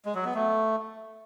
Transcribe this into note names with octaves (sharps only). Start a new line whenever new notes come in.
G#3
F#3
B3
A3